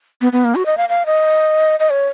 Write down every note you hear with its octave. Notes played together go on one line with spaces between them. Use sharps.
B3
B3
A#3
F#4
D#5
F5
F5
D#5
D#5
C#5